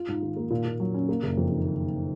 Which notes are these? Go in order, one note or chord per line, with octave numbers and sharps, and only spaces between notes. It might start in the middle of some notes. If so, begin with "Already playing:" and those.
Already playing: F4
G#2
D#3
A#3
A#2
A#2
F#3
C#4
A#3
F#1
F2
D#3